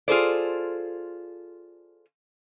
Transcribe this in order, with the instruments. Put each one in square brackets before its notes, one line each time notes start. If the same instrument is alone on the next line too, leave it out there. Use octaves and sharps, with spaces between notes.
[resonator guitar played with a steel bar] F4 G#4 A4 C5 D5